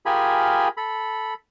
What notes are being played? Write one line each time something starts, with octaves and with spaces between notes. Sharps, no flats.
F4 G4 G#4 A#4 G#5 B5
A4 B5